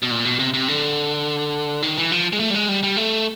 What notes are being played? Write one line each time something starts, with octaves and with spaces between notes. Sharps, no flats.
B2
A#2
B2
C3
C3
D3
D#3
E3
F3
G#3
A3
G3
G#3
G3
G3
A3